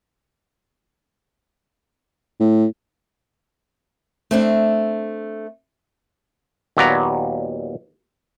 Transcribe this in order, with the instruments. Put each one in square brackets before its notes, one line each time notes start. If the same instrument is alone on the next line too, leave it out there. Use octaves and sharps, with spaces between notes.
[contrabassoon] A2
[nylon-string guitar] A3 C4 D4
[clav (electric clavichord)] D#2 A#2 F#3 B3 D5 A#5